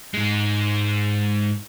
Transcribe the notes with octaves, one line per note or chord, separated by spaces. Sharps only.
G#2 G#3